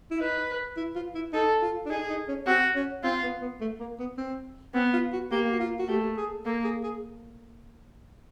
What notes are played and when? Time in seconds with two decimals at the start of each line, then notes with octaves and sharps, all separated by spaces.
0.11 E4
0.19 D#4 B4
0.77 E4
0.95 F4
1.15 E4
1.33 D#4 A4
1.62 F4
1.85 D4
1.90 D#4 G#4
2.09 D#4
2.28 C#4
2.47 C4 F#4
2.75 C#4
3.03 C4 F4
3.23 B3
3.42 B3
3.61 A3
3.80 A#3
3.99 B3
4.17 C4
4.74 B3 C4
4.93 F4
5.13 F#4
5.31 A#3 G4
5.52 F#4
5.60 F4
5.79 F#4
5.88 A3 G4
6.17 G#4
6.45 A#3 A4
6.64 G#4
6.83 G#4